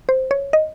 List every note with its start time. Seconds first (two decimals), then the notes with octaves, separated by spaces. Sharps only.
0.09 C5
0.31 C#5
0.53 D#5